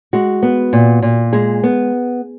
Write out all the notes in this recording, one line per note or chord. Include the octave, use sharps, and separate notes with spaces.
G#3 F#4
B3
A#2
A#2
G#3 G#4
B3